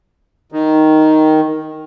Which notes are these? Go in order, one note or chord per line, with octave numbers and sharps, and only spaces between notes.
D#3